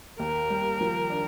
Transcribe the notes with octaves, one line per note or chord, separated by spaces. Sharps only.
D#2 A#4
G3
F3
D4